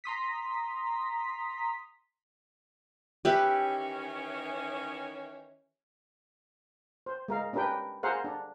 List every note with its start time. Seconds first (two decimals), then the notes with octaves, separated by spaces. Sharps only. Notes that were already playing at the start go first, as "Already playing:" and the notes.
0.04 A#5 C6 D#6 B6
3.25 D#3 E3 C#4 G4 B4 E5
7.06 C5
7.28 G#3 A#4 F5
7.53 C#4 D4 G4 A#4 B4 G5
8.03 G#4 A#4 C5 F5 F#5
8.24 D4